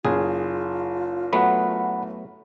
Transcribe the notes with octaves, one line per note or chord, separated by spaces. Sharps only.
F#1 F4 G#4
F#3 A3 B3 F#5 B5